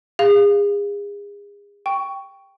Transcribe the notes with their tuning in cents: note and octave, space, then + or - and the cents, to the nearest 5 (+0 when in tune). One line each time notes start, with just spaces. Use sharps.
G#4 -35 F5 +0
G5 +0 C#6 +10